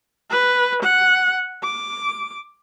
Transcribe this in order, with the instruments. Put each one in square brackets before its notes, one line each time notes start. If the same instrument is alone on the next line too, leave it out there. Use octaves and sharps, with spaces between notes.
[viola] B4
F#5
D6